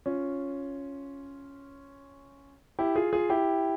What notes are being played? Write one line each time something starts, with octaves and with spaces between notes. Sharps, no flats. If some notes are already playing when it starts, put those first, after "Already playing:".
C#4 F4
E4 G4
F4 G#4
F4 G#4
E4 G4